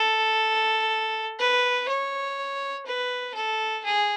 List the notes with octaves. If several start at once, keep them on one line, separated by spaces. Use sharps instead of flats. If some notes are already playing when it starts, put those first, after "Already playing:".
Already playing: A4
B4
C#5
B4
A4
G#4